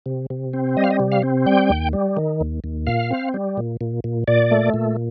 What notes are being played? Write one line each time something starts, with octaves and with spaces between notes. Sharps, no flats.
C3
C3
C4
G3 D#5
F5
D#5
C3
F5
C4
G3 G5
D#2
G3
D#3
D#2
D#2
A#2 F5
C4
G3
A#2
A#2
A#2
A#2 D5
A3
A#2